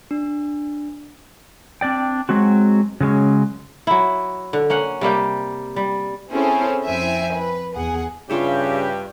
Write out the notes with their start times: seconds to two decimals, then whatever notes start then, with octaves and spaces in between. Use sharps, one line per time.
0.11 D4
1.81 C4 D4 D5 G5
2.29 F#3 G#3 C4 F#4
3.01 C#3 F#3 G#3 C#4
3.87 F#3 E4
4.53 D3
4.70 A#3 C#4 F#5
5.01 C3 G3 A#3 G4
5.76 G3
6.31 C4 C#4 E4 G#4 A4 C5
6.86 F2 C4 E4 E5 G#5
7.34 B4
7.75 E2 G#4 F#5
8.30 G2 C#3 F4 G4 C#5 E5